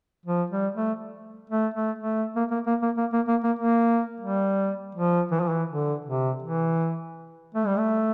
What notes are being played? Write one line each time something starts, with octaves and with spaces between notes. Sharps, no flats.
F3
G3
A3
A3
A3
A3
A#3
A#3
A#3
A#3
A#3
A#3
A#3
A#3
A#3
G3
F3
E3
F3
E3
D3
C3
E3
A3
G3
A3